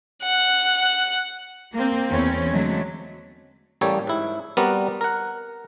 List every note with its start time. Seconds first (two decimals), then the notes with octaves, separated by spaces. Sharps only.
0.23 F#5
1.73 A#3 C4
2.09 E2 C4 C#4
2.51 D3 F#3 G#3 A3
3.81 A1 G3 A#3 G4 A4 C#5
4.07 G#2 E4
4.57 G3 B3 C4 F#4 A#4 D5
5.01 A#4 F#5